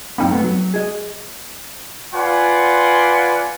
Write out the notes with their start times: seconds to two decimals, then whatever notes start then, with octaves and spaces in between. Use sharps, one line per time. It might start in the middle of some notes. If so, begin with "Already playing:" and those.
0.18 F#2 A#3 C4 D#4 B5
0.31 A3 B3
0.44 F#3
0.74 G#4 D#5
2.14 F4 B4 D5 F#5 G#5 C6